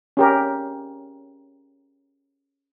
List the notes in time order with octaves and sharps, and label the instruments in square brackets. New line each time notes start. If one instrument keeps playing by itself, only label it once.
[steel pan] C#4 G4 A#4